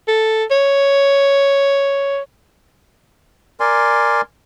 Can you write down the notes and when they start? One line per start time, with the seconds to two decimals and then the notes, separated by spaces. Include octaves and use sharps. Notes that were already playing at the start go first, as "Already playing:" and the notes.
0.08 A4
0.51 C#5
3.60 A#4 D5 G#5 C6